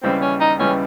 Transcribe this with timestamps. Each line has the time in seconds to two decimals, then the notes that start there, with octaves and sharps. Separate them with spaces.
0.03 D#2 C#3 E3 G3 C4
0.22 C#4
0.41 D#4
0.59 D#2 C#3 E3 G3 C#4